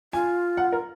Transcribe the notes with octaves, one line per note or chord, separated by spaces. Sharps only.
F4 G#5
F#5
A#4